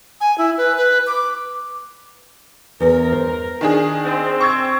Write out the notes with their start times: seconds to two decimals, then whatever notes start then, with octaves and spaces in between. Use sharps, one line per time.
0.21 G#5
0.38 E4
0.58 B4
0.77 B4
1.07 D6
2.80 E2 A#4
3.12 C5
3.61 D#3 D4 G#4
4.05 C4
4.41 C#6 E6 G#6